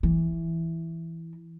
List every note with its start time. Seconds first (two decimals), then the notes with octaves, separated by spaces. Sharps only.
0.03 E3